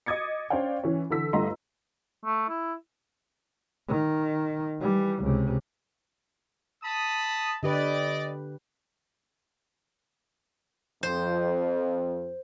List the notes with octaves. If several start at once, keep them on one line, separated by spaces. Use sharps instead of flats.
D#5 D6 D#6 G#6 A6 C#7
C#4 D4 C5 D5 F5 G5
E3 C#4
D3 E3 A4 E6 B6
G1 G2 A3 D#5 A#5 C6
A3
E4
D#3
E3 G3
C#2 C3
A5 B5 D#6
D3 G4 B4 D5 D#5
F2 C5